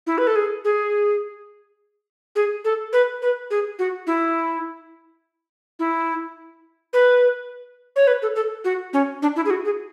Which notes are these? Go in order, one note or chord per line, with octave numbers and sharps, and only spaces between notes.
E4
B4
A4
G#4
G#4
G#4
A4
B4
B4
G#4
F#4
E4
E4
B4
C#5
B4
A4
A4
F#4
C#4
D4
E4
G#4
F#4
G#4